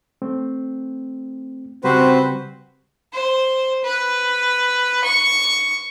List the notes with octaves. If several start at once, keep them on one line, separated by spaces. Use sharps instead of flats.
A3 C4
C#3 G3 C4 F#4 G4 B4 C5
C5
B4
C#6